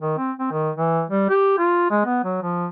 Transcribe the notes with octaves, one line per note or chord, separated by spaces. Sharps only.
D#3
C4
C4
D#3
E3
G3
G4
F4
G#3
B3
F#3
F3